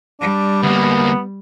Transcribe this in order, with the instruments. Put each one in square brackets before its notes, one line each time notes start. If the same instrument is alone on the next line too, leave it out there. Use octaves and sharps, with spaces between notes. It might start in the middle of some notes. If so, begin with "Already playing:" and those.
[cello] G3 [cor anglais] D4
[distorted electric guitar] D2 A#3 [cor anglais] B3